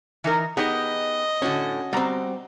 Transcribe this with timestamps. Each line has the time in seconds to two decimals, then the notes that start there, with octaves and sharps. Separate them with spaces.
0.24 E3 D#4 A#4
0.57 B3 D#4 G4 G#4 D#5
1.42 A2 D3 C#4 F#4
1.93 G3 B3 C4 F#4 A#5